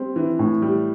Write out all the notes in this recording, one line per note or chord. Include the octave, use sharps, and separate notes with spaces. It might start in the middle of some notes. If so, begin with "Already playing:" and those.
Already playing: G3 C4
E3
A2
G3